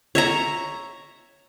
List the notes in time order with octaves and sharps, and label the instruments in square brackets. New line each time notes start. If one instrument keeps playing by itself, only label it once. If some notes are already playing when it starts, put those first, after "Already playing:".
[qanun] C#5 E5 A#5